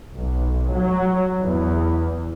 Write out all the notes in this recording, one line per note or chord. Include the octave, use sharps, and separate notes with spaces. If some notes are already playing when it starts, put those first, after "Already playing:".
B1
F#3
E2